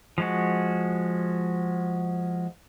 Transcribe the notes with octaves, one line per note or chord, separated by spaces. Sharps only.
F3 G#3 F#4